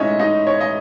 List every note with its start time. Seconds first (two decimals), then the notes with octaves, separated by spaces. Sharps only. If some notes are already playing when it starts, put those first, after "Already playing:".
Already playing: A2 G#3 C#4 D#4 C#5 D#5 E5
0.19 D#4 D#5
0.47 C#5
0.61 D#5